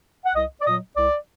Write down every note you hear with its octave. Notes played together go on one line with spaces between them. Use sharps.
F#5
C2 D#5
D5
A#2 F#3 D#5
C2 D5